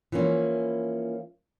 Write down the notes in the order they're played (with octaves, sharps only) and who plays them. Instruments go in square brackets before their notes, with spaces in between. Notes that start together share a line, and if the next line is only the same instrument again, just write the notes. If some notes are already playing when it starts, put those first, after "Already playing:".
[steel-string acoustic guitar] E3 F3 A#3 C#4